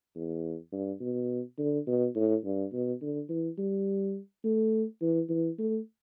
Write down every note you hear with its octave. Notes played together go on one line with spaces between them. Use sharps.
E2
G2
B2
D3
B2
A2
G2
B2
D3
E3
G3
A3
E3
E3
A3